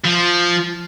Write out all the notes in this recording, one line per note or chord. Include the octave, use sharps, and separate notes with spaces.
F3